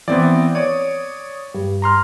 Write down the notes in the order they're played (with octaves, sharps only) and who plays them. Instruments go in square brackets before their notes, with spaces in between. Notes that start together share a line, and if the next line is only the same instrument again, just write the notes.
[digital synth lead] E3 [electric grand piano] B3 C4 D5
[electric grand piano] C#5 D5 [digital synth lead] D#6
[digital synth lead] G2
[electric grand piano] A#5 C6 F6